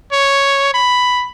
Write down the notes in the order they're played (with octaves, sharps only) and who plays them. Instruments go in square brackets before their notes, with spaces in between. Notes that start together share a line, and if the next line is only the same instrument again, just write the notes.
[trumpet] C#5
B5